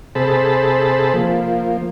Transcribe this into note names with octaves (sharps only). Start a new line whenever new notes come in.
C3 G#4 A4 C5 A5 B5
F3 A#3